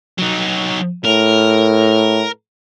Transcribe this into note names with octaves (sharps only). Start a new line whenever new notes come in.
F#3 D#4
A2 A#4